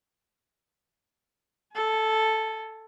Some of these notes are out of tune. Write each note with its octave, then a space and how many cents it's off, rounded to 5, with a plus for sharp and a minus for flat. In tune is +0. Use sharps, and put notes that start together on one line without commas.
A4 +0 G#5 +35